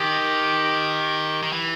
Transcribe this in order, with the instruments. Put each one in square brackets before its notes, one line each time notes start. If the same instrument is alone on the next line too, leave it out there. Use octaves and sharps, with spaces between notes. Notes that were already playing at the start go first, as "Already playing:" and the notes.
Already playing: [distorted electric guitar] D#3 [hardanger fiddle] G4
[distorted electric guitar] D#3
E3